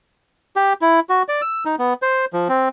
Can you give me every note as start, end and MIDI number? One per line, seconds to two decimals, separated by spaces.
0.56 0.73 67
0.82 1.00 64
1.09 1.23 66
1.28 1.41 74
1.42 1.64 88
1.65 1.75 63
1.79 1.94 59
2.02 2.25 72
2.33 2.48 53
2.49 2.69 60